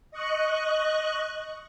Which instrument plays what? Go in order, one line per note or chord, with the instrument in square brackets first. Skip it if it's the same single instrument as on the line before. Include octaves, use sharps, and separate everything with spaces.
[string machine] D#5 C#6 F#6